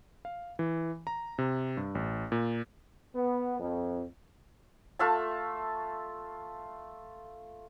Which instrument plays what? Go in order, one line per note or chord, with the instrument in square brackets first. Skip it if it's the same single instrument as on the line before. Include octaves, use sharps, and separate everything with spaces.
[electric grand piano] F5
E3
A#5
C3
G2
A1
A#2
[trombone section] B3
F2
[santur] A3 F4 E5 A5